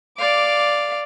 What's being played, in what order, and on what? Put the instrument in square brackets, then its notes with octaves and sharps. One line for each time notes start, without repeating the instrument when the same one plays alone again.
[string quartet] D5 F5 D6